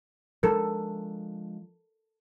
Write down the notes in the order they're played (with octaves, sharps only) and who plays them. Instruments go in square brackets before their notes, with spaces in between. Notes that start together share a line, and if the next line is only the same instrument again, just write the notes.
[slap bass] F3 G#3 D4 [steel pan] A4 A#4